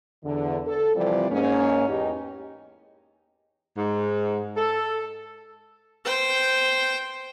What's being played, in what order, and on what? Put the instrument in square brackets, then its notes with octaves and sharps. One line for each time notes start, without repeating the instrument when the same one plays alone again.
[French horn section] E2 D3
A4
C3 E3 F3 G3 C4 D5
G#2 A#3 C#4
E2 D#4 G4
[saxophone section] G#2
A4
[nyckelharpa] C5 G5